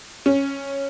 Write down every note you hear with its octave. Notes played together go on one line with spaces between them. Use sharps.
C#4